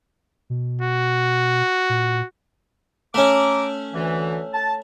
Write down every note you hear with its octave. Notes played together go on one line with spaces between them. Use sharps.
B2
F#4
A#2
A3 C#4 A#5 D6
D2 E3
A5